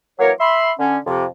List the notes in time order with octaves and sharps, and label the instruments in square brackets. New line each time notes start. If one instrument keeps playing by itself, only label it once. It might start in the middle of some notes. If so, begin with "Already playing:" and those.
[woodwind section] E3 F#3 A#3 A#4 C#5
E5 B5 C6
D3 C#4
F2 C3